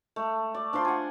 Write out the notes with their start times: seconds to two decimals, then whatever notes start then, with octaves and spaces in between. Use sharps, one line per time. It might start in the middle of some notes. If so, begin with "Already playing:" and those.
0.16 A3
0.54 D5
0.73 D4 F4 C5 C6
0.85 F#5 G#5